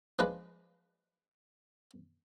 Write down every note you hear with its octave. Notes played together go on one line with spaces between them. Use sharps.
F3 G#3 D4 B4